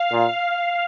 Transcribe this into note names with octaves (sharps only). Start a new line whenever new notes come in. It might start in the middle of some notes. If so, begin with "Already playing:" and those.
Already playing: F5
A#2